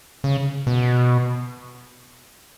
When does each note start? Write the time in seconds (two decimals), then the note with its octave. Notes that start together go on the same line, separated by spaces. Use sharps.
0.24 C#3
0.67 B2